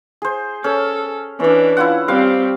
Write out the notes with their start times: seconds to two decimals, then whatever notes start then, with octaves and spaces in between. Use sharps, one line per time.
0.22 G#4 C5
0.64 C#4 A4
1.40 E3 C#4 D4 D5
1.77 E4 F4 F#5
2.08 G3 C4 C5 F5 G5